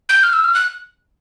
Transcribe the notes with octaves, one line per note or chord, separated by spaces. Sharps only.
G6
F6
E6
F6
F#6